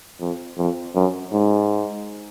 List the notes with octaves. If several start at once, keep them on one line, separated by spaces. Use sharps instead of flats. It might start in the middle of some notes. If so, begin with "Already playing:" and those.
F2
F2
F#2
G#2